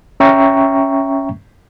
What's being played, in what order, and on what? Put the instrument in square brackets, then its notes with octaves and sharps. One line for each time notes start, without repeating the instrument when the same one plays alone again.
[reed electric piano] C#4 E5 G5 A#5 C#6